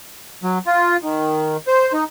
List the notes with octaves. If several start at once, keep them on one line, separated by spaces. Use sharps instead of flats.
F#3
F4
D#3
C5
D#4